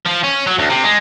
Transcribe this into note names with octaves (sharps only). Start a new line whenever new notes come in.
F3
C#4
F#3
D2
C3
G#3